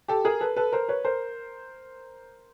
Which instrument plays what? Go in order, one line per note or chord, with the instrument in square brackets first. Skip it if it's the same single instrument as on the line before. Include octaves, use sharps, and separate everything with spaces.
[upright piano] G4 A4
G#4 A#4
A4 B4
A4 B4
A#4 C5
B4 C#5
A#4 C5